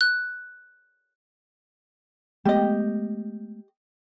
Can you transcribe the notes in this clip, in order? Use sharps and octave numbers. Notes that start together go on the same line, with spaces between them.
F#6
G#3 A3 B3 G4 D#5